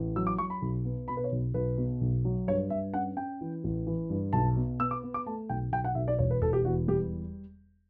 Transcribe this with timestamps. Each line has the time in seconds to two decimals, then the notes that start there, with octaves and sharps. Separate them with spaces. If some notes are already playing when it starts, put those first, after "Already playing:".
Already playing: A1
0.16 F#3 E6
0.27 D6
0.38 F#3 C#6
0.50 B5
0.62 B1
0.84 B3
1.08 B2 B5
1.17 B4
1.24 C#5
1.32 B1
1.54 B1 B4
1.78 B2
2.01 B1
2.25 F#3
2.48 G2 C#5
2.70 G2 E5
2.94 C#4 F#5
3.16 C#4 G5
3.41 E3
3.64 A1
3.87 E3
4.10 G2
4.33 B1 A5
4.57 B2
4.79 B3 E6
4.91 D6
5.03 B3
5.14 D6
5.26 A3 A5
5.49 B1 G5
5.72 B1 G5
5.84 F#5
5.95 B1 E5
6.08 D5
6.19 E1 C#5
6.30 B4
6.41 E1 A4
6.53 G4
6.65 E2 F#4
6.88 G3 G4